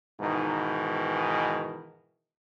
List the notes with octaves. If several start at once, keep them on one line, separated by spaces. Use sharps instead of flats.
G#2 B2 D#3 E3